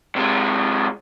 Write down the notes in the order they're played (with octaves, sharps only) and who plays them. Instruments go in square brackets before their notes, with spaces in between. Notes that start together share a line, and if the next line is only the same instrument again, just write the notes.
[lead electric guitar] C3 G#3